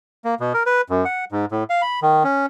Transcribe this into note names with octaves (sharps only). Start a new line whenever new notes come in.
A#3
B2
A#4
B4
F#2
F#5
G#2
A2
F5
B5
D#3
C#4